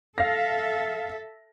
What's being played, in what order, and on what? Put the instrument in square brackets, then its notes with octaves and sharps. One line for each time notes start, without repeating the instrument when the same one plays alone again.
[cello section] A4 E5 [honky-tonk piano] F5 A#6